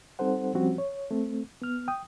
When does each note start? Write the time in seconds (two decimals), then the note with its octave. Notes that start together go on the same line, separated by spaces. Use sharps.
0.19 G3 C4 D#4 A4 C5 F#5
0.55 F3 G3 C4 C#4 F#4
0.78 C#5
1.11 A3 C4
1.62 B3 F6
1.88 G5 D#6